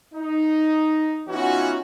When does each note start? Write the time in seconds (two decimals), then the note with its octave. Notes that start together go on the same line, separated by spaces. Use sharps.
0.15 D#4
1.28 E3 B3 C#4 D#4 F4 F#4